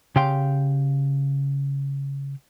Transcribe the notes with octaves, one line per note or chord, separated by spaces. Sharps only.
C#3 G4 F5 G5 C6